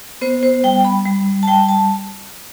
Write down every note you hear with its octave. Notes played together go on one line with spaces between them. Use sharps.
B3 C5
C5
G3 G5
B5
G3
A5
G3 G5
A5